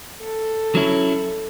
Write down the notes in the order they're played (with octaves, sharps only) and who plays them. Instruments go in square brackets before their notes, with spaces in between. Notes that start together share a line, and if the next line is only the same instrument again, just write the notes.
[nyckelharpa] A4
[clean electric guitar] F#3 C#4 E4